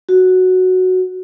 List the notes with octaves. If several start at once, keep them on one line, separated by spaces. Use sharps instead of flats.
F#4